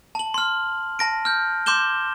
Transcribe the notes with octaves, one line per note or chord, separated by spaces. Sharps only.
A5 F#7
C6 F6
A5 A#6 D7
F6 G6
C6 D6 G6 E7 G7